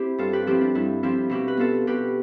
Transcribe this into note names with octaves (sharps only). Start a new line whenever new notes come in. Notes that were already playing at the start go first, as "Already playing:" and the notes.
Already playing: C4 E4 G4 C5
G2 F4 A4
G4 B4
F3 C4 E4 G4
D4 F4
G2 E4
F3 C4 E4 G4
B2 E4 G4
B4
B3 F4 A4
B2 G4 B4